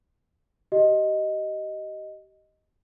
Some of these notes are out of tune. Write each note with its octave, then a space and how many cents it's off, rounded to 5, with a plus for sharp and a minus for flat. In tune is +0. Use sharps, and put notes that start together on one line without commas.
G4 -30 D#5 +0